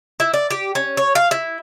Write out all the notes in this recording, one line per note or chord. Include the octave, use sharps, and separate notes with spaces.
E4
D5
G4
C#4
C#5
F5
E4